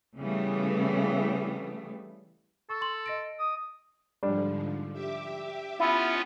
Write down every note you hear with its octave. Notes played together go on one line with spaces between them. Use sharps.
C#3 E3 G3 A3 B3
A4 C#6
C6 F#7
D#5 A#6 D7
D#6
G#2 D3 F3 G3 D4
G4 E5 D6
B3 C#4 E4 F4